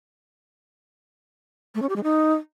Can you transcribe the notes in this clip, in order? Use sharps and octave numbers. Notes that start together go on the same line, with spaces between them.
A3
C#4
G4
G#3
D#4